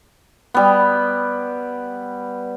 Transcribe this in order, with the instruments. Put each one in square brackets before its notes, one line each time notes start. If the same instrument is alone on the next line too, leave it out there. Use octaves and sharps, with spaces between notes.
[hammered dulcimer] G3 B3